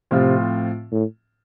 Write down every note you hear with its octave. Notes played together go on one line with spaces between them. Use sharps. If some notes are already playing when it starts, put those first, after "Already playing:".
A2 C3 F3 C4 F4
A2